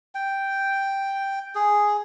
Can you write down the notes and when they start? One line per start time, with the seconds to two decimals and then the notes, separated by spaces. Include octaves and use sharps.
0.15 G5
1.55 G#4